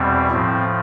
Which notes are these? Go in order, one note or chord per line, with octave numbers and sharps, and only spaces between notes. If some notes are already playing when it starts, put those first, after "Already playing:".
Already playing: E2 B2 G3 C4
A2 F3 C4